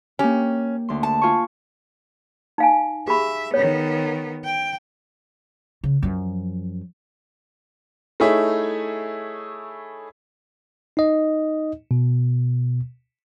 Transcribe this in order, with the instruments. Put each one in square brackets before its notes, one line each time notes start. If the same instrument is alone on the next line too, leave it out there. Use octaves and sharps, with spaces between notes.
[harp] A#3 G4 [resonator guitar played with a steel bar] C#4
[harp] D2 C6
[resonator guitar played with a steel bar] A5
[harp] F4 G#5 C#6
[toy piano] D#4 F5 G#5
[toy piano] G4 G#4 B5 [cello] E5
[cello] D#3 B3 [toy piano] C#5
[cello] G5
[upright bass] C#3
F#2 F3
[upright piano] A3 D#4 E4 G#4 C#5 E5
[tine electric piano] D#4 D#5
B2